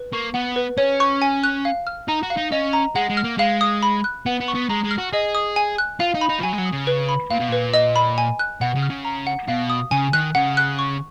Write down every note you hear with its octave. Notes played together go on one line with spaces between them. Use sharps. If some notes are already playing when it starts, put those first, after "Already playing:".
Already playing: B4
A#3 C#6
B3 F#5
B4
C#4 C#5
C#6
G#5
F#6
F5
F6
D#4 A#5
F#4
F5
D#4
C#4 D#5
A#5
G#3 F#5
G#3
F6
A#3
G#3 F5
D#6
B5
F#6
B3 F#5
B3
C#6
B3
G#3 A#5
G#3
F6
F#4
G#4 D#5
D#6
G#5
F#6
F4 F5
D#4
B5
D#4
F3
F#3 G#5
G#3
F#3
D#6
C#3
B4
B5
A#2 F5
B2
A#2 B4
D#5
B5
G#5
F#6
B2 F#5
C#3
F6
C#3
A#5
F#5
B2 F5
D#6
C#3 G#5
D#3 F#6
C#3 F#5
F#6
C#6